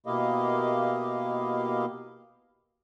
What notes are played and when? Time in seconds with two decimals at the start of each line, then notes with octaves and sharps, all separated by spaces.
0.06 B2 A#3 E4 G4 D#5 F5